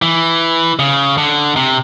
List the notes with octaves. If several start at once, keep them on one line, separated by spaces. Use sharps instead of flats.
E3
C#3
D3
C3